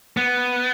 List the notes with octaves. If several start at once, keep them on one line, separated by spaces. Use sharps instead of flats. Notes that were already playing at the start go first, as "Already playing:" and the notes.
B3